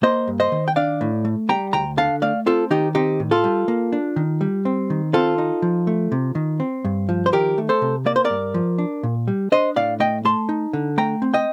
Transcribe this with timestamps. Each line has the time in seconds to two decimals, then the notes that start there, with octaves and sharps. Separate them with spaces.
0.03 A#3 C5 D#5
0.28 G2
0.40 C5 D#5
0.52 D#3
0.68 G5
0.76 D4 D5 F5
1.01 A2
1.25 A3
1.49 G3 G5 A#5
1.73 D2 G5 A#5
1.97 D3 F5 A5
2.22 A3 D5 F5
2.46 C4 F4 A4
2.71 D#3 D#4 G4
2.95 C4 D#4 G4
3.20 A2
3.31 F4 A4
3.44 G3
3.68 A#3
3.93 D4
4.16 D#3
4.41 G3
4.65 C4
4.90 D#3
5.13 C4 F4 A4
5.38 D#4
5.62 F3
5.87 A3
6.12 C3
6.35 D#3
6.60 C4
6.85 G2
7.09 F3
7.26 C5
7.32 D#3 G4 A#4
7.58 A3
7.69 A4 C5
7.82 C3
8.06 A#3 D5
8.16 C5
8.24 A#4 D5
8.30 G2
8.54 F3
8.78 D4
9.03 A#2
9.28 G3
9.52 D4 C5 D#5
9.76 A2 D5 F5
10.00 A3 D#5 G5
10.25 A3 A5 C6
10.49 D#4
10.73 D3
10.98 A3 G5 A#5
11.22 C4
11.34 D#5 G5